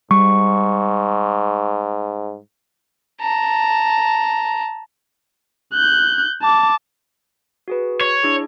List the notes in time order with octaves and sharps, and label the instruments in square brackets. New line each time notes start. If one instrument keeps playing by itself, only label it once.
[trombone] G#2 [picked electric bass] G3 [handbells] C#6
[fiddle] A5 A#5
[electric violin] F#6 G6
A5 D6
[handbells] F#4 G#4 B4
[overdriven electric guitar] C#5
[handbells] D4 E4 G#4